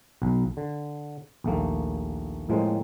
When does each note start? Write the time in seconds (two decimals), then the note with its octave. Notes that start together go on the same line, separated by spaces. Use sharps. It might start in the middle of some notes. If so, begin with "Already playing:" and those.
0.22 B1
0.57 D3
1.44 A#1 D#2 A3 A#3
2.49 A2 F3 G#3 A#3 C4